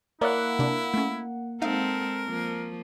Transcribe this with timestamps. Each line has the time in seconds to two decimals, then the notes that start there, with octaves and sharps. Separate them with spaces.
0.21 A#3 E4 C#5 D5 E5 F#5
0.59 C3 D4
0.94 A3 C#4
1.62 G#3 C4 D#4 A4 A#4 E5 F5
2.25 F3 A#3